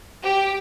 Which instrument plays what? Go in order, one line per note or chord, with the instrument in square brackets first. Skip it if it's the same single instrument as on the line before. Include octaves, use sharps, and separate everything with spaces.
[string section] G4